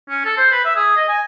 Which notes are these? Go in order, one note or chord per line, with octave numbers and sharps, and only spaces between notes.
C#4
A4
C5
B4
E5
G#4
D#5
G#5